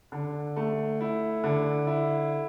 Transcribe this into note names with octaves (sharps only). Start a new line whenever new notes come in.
D3
A3
E4
D3
E4